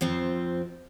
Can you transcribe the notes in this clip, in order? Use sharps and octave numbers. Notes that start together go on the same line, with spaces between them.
F2 F3 C4